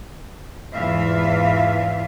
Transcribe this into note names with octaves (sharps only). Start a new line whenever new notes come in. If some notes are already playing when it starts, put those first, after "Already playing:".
E2 G#2 E3 F4 E5 F5